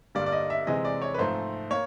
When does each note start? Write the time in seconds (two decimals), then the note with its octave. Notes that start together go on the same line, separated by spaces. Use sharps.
0.15 G2 D3 G3 A#3 D5
0.26 D5
0.32 D#5
0.50 E5
0.67 C3 E3 G#3 C4 D#5
0.85 D5
1.02 C#5
1.14 B4
1.18 G#2 F3 A3 C4 C5
1.70 A#3 C#5